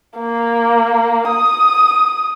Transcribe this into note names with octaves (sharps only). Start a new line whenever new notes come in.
A#3
D#6